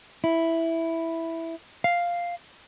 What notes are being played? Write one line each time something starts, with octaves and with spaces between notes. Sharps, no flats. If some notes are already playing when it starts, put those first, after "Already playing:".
E4
F5